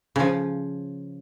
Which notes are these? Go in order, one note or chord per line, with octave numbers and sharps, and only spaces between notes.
C#3 F3